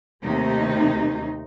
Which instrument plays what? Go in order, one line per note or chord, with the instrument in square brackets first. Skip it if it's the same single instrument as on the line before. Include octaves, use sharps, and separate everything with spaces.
[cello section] D#2 C3 A3 D#4